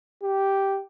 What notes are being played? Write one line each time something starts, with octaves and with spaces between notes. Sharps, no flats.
G4